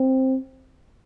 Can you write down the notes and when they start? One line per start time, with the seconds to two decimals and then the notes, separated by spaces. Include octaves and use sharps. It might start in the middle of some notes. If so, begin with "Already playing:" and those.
Already playing: C4